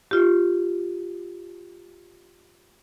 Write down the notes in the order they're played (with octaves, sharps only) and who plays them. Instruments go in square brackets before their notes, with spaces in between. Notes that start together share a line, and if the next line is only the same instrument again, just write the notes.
[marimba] F4 G4